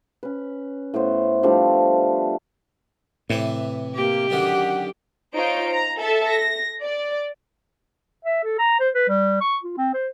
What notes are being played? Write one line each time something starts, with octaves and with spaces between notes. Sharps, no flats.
C#4 B4
A2 B3 C5
F3 G3 A3 D4
A2 C3 E3 B4
A#3 G4
F#2 D3 D#3 F#5
D#4 F4 C5 C#5 D7
A#5
A4 E5 A5
A#6
D5
E5
A4
A#5
C5
B4
G3
C#6
F4
C4
C5